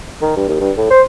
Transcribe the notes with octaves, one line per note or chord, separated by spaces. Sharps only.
D#3
G2
D#2
G2
A2
C5